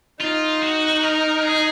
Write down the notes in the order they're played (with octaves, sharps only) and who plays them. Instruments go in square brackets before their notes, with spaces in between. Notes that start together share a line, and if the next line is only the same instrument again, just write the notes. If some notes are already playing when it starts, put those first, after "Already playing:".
[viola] D#4 [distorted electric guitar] F4
[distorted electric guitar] F#4
A#4
G#4